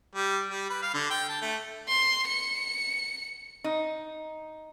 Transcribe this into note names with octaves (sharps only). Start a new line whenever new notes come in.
G3
G3
B4
F5
D3
G5
A5
A3
C6
C#7
D#4